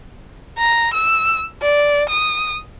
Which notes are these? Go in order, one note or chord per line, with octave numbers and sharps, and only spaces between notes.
A#5
E6
D5
D#6